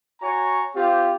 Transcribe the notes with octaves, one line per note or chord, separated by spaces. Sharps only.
F#4 C#5 G#5 A#5 C#6
C4 F4 G4